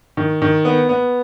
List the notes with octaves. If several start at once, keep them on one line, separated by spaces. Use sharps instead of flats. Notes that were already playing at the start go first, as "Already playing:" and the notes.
D#3
D#3
B3
B3